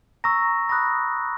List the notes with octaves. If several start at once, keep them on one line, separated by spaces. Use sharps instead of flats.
A#5 C#6 E6 A#6
B5 D#6 F#6 A#6